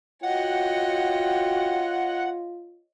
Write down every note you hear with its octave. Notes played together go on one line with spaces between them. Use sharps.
F4 F#4 C#5 D#5 F#5 G5